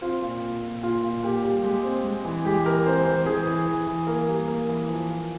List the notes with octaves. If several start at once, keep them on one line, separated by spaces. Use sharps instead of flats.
C4 F4
A#2
A#2
A#2
A#2 F4
A#2
A#2 G4
G3
G#3 G4
C4
G#3
E3
G#3 G4
E3 A#4
C4 C5
E3 C5
E3 G#4
E3
E3
E3
A#3 A#4
G3
A#3
E3
F3
A#3